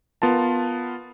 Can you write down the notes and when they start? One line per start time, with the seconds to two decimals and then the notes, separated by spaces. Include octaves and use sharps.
0.22 B3 F4 A#4 A5